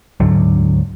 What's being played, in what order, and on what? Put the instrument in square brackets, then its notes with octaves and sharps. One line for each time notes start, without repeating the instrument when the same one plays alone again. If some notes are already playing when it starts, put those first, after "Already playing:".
[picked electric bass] D2 G#2 D3 F#3